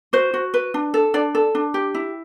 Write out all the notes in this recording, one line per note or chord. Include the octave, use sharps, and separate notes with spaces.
F#4 C5
F#4
B4
D4
A4
D4 D5
A4
D4
G4
E4